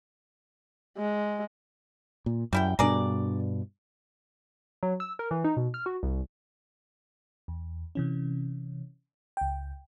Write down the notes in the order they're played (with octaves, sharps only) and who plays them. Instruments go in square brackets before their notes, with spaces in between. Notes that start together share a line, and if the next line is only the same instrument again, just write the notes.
[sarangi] G#3
[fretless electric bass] A#2
[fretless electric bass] F#2 [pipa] G3 E4 G5
[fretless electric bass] G2 B2 D4 [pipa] G#4 A#4 D5
[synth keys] F#3
E6
A#4
E3
D#4
B2
F6
F#4
C2
[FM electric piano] E2
C3 E3 C#4
C#2 G5